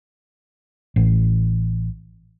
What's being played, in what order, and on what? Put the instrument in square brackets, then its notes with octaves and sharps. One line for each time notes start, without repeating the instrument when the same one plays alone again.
[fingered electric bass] A1